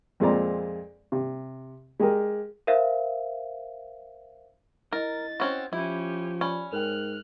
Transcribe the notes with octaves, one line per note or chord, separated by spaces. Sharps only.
F2 A#2 G#3 C4 D5 A#5
C3
G#3 G4 G#4 A#4
A#4 C5 E5 F5
E4 A#4 D#5 A6
C4 C#4 F#4
F3 C#4 E4 G4 B5
C#4 D5 B5
G#2 A#4 G5 F6 F#6